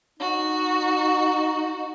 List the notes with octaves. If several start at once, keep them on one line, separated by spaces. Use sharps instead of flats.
D#4 F#4